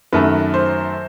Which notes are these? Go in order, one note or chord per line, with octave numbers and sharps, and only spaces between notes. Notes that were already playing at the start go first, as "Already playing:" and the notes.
F#2 D#3 F#3 A3 B4
C5